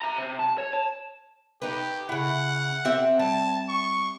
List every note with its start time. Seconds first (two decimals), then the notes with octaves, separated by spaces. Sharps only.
0.02 E5 A#5
0.18 C3
0.39 A5
0.58 C#5
0.73 A5
1.62 D#4 G4 B4
2.09 C#3 E4 F#5
2.85 C4 G4 E5
3.19 G3 A5
3.69 C#6